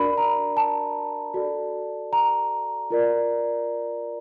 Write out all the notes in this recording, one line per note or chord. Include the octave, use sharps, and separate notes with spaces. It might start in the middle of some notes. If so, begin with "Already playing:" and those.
Already playing: D4 F#4 A#4 D5 B5
A#5
A5
F#4 A4 D5
A#5
F4 A#4 D5